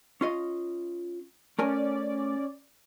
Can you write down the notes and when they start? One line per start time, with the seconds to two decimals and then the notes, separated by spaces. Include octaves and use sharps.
0.21 C#4 F4 D#5
1.59 A3 C#4 A#4 D5 G#5